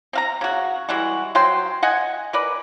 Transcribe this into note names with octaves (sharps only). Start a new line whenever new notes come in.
C4 F5 A#5
C#3 F#4
E3 G3 G#3 F#4
F#3 C5 G5 C6
D#5 F#5 G#5
A#4 B4 D5